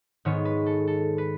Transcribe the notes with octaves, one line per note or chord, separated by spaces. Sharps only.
G#2 D#3 G#3 B3 C#5
B4
A4
A4
B4